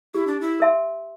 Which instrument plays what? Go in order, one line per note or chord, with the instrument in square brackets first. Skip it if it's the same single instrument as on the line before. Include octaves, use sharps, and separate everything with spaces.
[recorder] E4 [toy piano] G4
[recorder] D4
E4
[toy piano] A#4 E5 A5 C6